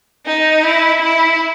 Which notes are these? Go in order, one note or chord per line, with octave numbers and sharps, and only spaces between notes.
D#4
E4
E4